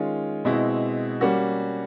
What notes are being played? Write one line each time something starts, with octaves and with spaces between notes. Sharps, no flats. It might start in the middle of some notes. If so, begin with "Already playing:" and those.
Already playing: D#3 G#3 C#4 F4
B2 G#3 C4 E4
G3 A#3 C#4 F#4